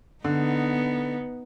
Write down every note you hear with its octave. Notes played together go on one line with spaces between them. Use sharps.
D3 B3 D#4